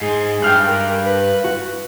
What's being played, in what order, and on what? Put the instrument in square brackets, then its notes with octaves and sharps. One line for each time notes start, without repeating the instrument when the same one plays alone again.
[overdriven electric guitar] G#2 [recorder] G#4
[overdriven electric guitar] G2 [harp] G5 F6 F#6
[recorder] A#4
B4
[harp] F#4